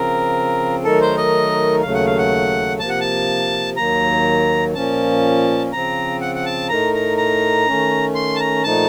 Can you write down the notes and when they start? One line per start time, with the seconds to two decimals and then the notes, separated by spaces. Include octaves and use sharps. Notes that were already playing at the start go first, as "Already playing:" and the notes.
Already playing: C#3 F3 C4 A#4
0.84 D#3 F#3 A3 D#4 A4 A#4
1.01 C5
1.17 D#5
1.82 D#2 C#3 F#3 A3 F5
1.94 F#5
2.07 F5
2.18 F#5
2.79 C3 F3 A#3 A5
2.89 F#5
3.01 A5
3.77 D#2 D#3 F#3 A#3 A#5
4.75 A#2 F3 A#3 C#4 A5
5.72 C#3 F3 C4 A#5
6.21 F#5
6.35 F#5
6.45 A5
6.69 A2 A3 D#4 A#4 A#5
6.94 A#5
7.17 A#5
7.67 D#3 A3 C#4
8.15 C6
8.36 A5
8.40 A#5
8.64 A#2 F3 A3 D#4 A5